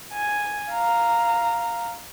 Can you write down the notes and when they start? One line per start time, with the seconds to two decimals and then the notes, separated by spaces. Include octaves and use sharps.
0.13 G#5
0.71 F5 A#5